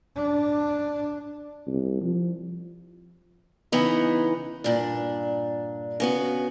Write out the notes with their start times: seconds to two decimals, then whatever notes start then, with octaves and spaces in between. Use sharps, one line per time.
0.16 D4
1.67 C2
2.02 F3
3.72 C#3 E3 B3 D#4
4.64 G2 A#2 D4
6.00 C#3 B3 F#4